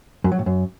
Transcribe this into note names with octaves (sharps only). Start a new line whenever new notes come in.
F#2
F#3
A2
F#2